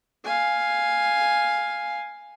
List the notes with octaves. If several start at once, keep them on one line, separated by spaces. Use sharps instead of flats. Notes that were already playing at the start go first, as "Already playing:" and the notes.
F5 G#5